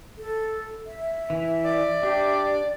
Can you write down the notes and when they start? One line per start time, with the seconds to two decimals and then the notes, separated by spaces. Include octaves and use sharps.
0.18 A4
0.87 E5
1.30 E3
1.64 D5
2.03 D4 G4